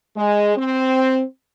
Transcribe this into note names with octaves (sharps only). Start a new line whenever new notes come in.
G#3
C4